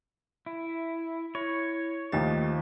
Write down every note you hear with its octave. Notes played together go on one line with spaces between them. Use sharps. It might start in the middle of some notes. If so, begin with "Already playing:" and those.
E4
E4 C#5
D#2 D#3 F3 A3 G4 A6